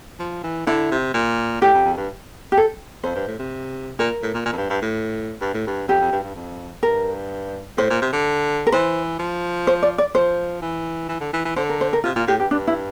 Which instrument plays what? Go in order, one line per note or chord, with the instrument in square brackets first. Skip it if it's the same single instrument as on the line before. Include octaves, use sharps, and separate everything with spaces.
[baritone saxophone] F3
E3
[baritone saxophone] D3 [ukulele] E4
[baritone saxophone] C3
A#2
[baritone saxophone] A2 [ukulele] G4
[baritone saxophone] F2
F2
G2
[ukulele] G4
A4
[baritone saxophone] F2 [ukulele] C5
[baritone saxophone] G2
A2
C3
[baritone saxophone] A#2 [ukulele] A#4
[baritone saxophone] A2
A#2
A#2
F2
G2
G2
A2
G2
A2
G2
[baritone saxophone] F2 [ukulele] G4
[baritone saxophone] F2
G2
G2
F2
[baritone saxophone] G2 [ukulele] A#4
[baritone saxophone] A2 [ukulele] C5
[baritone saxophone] A#2
C3
D3
[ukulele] A#4
[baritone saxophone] E3 [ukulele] C5
[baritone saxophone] F3
[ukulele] C5
D5
D5
[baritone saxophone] F3 [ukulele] C5
[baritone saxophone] E3
E3
D3
E3
E3
[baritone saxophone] D3 [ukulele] C5
[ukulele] A#4
C5
A#4
[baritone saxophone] C3 [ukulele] F4
[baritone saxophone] A#2 [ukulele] F4
[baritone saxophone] A2 [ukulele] G4
[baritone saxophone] G2 [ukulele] G4
[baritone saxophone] G2 [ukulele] D4
[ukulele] E4